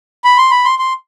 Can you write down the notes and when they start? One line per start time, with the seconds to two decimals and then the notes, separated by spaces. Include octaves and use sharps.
0.24 B5
0.38 C6
0.51 B5
0.65 C6
0.79 C6